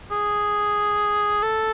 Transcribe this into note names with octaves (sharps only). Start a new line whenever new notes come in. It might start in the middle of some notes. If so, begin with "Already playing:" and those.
G#4
A4